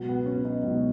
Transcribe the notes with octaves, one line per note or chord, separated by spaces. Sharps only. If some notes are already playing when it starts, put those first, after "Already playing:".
Already playing: C#2 B2 F#3 F#4
B3
C#4
D#4
C#2 B2 F#3